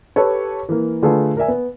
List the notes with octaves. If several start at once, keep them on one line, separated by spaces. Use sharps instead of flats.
G4 A4 B4 C#5
E3 A#3
D3 A3 F4 G#4 A4 B4
A#4 D5 E5 G#5
B3